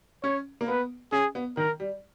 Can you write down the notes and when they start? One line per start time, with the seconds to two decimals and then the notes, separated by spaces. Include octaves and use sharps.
0.24 C#4 C#5
0.61 A#3
0.68 B3 B4
1.12 C#4 G#4
1.35 B3
1.57 D#3 A#4
1.80 G3